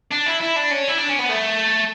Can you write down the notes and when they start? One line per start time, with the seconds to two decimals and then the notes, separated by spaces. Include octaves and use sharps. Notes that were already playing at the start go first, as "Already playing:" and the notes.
0.11 D4
0.26 E4
0.40 E4
0.56 D4
0.71 C#4
0.88 E4
0.97 D4
1.08 C#4
1.19 B3
1.29 A3